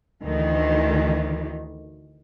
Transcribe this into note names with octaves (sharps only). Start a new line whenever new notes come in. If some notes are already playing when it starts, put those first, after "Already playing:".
D2 D#3 E3